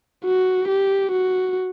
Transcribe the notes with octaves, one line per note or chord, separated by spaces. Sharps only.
F#4
G4
F#4